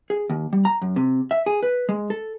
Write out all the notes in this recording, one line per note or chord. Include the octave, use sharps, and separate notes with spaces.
G#4
D#2
G3
A#5
F#2
C3
E5
G#4
B4
G#3
A4